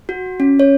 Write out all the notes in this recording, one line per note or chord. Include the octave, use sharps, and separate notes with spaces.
F#4
C#4
C#5